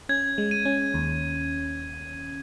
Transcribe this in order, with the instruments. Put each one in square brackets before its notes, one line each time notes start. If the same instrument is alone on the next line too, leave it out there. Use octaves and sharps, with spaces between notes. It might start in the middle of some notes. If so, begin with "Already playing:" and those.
[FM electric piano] C#4 [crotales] G#6
[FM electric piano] G#3
[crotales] D#7
[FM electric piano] C#4
D#2